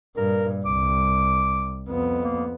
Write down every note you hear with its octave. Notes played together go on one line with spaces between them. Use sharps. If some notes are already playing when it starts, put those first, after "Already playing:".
G2 A#2 A#4
C2 D6
F2 B3
A#3